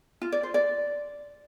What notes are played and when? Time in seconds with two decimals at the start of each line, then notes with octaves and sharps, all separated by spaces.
0.22 F4
0.32 D5
0.43 C5
0.54 D5